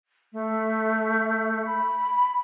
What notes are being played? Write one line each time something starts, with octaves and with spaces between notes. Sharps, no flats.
A3
B5